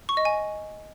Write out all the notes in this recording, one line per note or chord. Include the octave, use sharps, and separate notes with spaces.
C#6
D#5
G#5